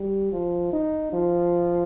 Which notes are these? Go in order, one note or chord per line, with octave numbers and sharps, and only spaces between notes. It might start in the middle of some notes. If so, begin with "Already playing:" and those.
Already playing: G3
F3
D#4
F3